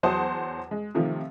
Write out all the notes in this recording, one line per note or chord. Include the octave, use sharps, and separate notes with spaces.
E2 F#3 C5 F#5 A5 D#6
G#3
C3 D#3 F3 A3